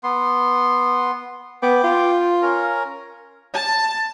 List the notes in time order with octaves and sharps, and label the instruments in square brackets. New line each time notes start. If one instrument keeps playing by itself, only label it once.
[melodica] B3 C6
[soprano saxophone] B3 [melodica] G5 D6
[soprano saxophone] F4
[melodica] C#4 A#4 A#5
[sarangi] A5